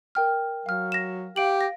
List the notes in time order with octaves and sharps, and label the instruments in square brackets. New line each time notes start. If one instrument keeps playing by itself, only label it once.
[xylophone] A#4 G5 F6
[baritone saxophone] F#3 [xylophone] F5 F6
[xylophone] A#6 E7
[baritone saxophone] G4 [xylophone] F5 D7 F#7
[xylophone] A#6